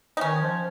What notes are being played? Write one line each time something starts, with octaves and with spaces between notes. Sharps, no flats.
D#4
D#3 C#4
F3